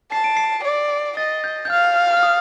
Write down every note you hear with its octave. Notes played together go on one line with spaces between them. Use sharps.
A5 C7
D7
C7
D5
D#5 A6
G6
G6
F5 F6
F6
D#6